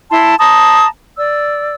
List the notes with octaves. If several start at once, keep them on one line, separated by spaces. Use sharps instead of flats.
E4 A5 C6
A5 A#5 C6 D#6
D5 E6